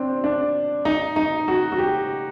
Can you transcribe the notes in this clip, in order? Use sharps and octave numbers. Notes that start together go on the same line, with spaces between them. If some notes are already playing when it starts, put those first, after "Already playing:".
Already playing: C4 D4
D4
D#4
D#4
F#4
F#4
G4